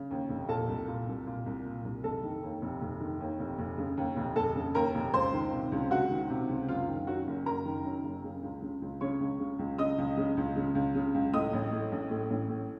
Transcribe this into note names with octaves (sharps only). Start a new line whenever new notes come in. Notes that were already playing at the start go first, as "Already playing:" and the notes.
Already playing: C#3
D#2
F1
A#2 A4 A5
C2
A#2
C2
A#2
C2
A#2
C2
F1 A4 A5
D#3
D#2
F1
F1
D#3
D#2
F1
F1
C#3
D#2
F1
F1 A4 A5
C#3
D#2 A#4 A#5
F1
C#2 C5 C6
D#3
C3
C#2
C#2 F#4 F#5
D#3
C3
C#2
F#1 F4 F5
D#3
F#2 F#4 F#5
F#1
F#1 A#4 A#5
D#3
F#2
F#1
C#3
C#2
C#3
C#2
C#3 C#5 C#6
C#2
C#3
C#2
C#3 D#5 D#6
C#2
C#3
C#2
C#3
C#2
C#3
C#2
A2 D#5 D#6
A1
A2
A1
A2
A1
A2